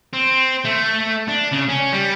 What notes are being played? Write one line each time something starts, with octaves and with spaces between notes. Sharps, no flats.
C4
A3
D4
C#3
C#4
G3